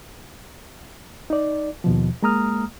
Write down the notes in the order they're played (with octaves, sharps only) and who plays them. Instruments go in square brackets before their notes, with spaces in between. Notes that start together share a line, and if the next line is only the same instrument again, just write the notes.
[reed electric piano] D#4 D5
D#2 B2 F3
G#3 A#3 A#5 D#6 F6